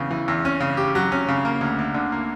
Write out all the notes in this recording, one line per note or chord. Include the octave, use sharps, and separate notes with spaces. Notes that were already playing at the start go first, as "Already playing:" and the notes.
Already playing: E2 C#3 E3 B3
E3
E2
C#4
C#3
G4
F#3
C#4
C#3
A#3
D2
D2
D3
A#3